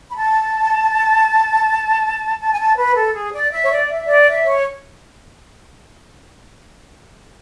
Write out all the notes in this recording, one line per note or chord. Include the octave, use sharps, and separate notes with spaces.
B5
A5
A5
G#5
A5
B4
A4
G#4
D5
E5
C#5
D5
E5
D5
E5
C#5